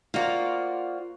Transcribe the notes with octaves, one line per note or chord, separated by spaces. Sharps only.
A#3 F4 F#4 C5 D5